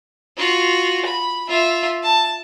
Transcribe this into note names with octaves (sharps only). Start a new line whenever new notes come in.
F4 F#4
B5
F4 E5
A5